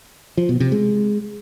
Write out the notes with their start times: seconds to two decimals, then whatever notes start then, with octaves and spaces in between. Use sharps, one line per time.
0.37 F3
0.49 B2
0.60 C3
0.72 G#3